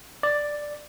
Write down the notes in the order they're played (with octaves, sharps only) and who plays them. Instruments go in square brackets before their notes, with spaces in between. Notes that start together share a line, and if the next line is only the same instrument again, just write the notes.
[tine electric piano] D5